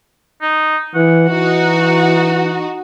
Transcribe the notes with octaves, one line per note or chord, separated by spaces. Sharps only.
D#4
E3 F#5
E3 D#4 F#4